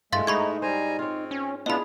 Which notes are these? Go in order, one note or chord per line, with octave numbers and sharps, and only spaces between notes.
G2 G#3 A3 E4 F5 C6 A6
G#2 D#4 F#5 B5 C#6 G#6
G3 C5 G#5 A#5
C4 F4 C#5
C#4
B3 D4 E4 F4 G#4 D#5 B5